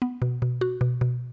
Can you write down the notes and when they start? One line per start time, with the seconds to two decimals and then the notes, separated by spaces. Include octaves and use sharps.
0.02 B3
0.22 B2
0.42 B2
0.61 F#4
0.81 B2
1.01 B2